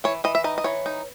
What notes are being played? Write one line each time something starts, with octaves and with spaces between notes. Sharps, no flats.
E3 C#5
E3 D#5
E5
D#4 D#5
D#5
E3 C#5
D#4